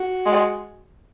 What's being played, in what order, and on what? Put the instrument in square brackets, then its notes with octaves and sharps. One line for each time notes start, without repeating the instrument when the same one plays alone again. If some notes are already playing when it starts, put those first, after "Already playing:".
Already playing: [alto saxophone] F#4
[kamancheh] G#3